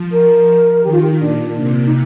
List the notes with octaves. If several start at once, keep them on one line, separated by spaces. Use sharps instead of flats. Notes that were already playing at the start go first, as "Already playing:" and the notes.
Already playing: F3
A#4
D#3 G4
F4
G4
F4
A#2 D4
C3
D#4